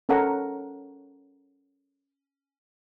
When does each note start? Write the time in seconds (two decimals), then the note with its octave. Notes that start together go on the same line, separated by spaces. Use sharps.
0.09 C#4 A4 A#4 C#5 F#5 A#5